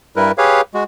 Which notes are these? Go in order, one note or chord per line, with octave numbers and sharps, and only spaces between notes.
G2 G3 E4 A#4 B4
G4 G#4 B4 C#5 F5
G#3 F#4